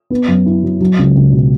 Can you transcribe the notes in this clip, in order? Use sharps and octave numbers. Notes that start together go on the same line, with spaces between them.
B3
F#2
E4
F#3
F#3
C#2
C#2
B2